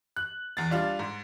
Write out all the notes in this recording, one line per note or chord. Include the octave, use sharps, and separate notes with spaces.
F#6
E2 A6
G3 D4 F4
G#2